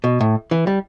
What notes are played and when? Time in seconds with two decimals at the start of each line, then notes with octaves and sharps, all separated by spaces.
0.04 B2
0.21 A2
0.51 E3
0.67 G3